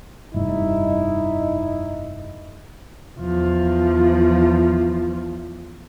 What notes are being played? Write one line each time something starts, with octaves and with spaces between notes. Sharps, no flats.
F1 G2 D#4 E4
E2 F3